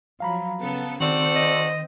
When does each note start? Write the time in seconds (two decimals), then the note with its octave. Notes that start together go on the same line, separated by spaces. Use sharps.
0.20 F3 F#3 F5 A#5 B5
0.59 C#3 B3 A4
1.00 D#3 C4 F#4 A4 C5 D5
1.35 D#5